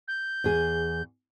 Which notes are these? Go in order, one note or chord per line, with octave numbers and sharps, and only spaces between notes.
G6
E2 G#4